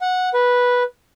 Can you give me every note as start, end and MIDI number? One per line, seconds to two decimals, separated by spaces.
0.01 0.29 78
0.34 0.83 71